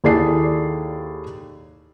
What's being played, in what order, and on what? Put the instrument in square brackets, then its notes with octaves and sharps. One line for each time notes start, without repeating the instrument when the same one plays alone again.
[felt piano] D#2 E4 G#4 A4 D5 C7